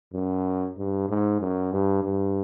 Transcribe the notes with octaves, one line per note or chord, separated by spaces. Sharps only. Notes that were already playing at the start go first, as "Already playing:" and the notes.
F#2
G2
G#2
F#2
G2
G2